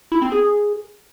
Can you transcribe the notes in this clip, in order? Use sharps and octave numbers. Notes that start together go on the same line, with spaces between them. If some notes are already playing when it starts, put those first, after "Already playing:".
E4
C4
G#4